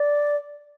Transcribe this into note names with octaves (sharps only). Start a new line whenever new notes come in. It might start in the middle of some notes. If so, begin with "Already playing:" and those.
Already playing: D5